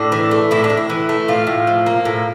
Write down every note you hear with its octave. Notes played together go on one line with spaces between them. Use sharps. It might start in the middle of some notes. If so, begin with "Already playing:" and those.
Already playing: A2 D4
E3
A3
A2 E4
D4
A2
E4
E3
A3
A2 F4
A2
F3
A#3
A2